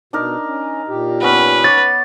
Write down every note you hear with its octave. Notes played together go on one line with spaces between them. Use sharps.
B2 D4 D#4 A#4
C#4
A#2 G4
B3 C#4 B4
C#5 D6 A6